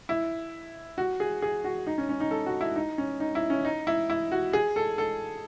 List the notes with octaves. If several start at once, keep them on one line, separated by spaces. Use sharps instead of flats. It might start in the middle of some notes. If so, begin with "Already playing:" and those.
E4
F#4
G#4
G#4
F#4
D#4
C#4
C#4
D#4
A4
F#4
E4
D#4
C#4
D#4
E4
C#4
D#4
E4
E4
F#4
G#4
A4
A4